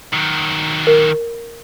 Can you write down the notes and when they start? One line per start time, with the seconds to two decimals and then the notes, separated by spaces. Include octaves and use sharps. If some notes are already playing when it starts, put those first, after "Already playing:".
0.13 D#3 F#3
0.87 A#4